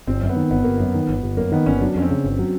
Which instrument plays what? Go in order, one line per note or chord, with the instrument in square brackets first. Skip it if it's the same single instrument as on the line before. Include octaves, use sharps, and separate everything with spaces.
[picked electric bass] G1 [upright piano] C4
[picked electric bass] F#2
[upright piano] B3
[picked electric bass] D#3
[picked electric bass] G1 [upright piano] B3
[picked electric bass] G1 [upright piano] A#3
[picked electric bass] F#2 [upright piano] B3
[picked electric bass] D#3
G1
G1
[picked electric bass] F#2 [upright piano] A#3
[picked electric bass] D#3 [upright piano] B3
[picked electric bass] G1 [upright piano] C#4
[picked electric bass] F#3 [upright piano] D4
[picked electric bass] F2 [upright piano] C#4
[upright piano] C4
[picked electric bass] C#3
G1
F#3